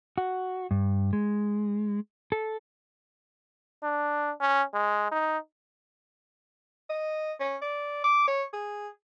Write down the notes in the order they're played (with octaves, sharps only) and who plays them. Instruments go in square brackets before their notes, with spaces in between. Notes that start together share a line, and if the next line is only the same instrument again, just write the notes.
[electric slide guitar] F#4
G2
G#3
A4
[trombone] D4
C#4
G#3
D#4
[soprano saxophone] D#5
C#4
D5
D6
C#5
G#4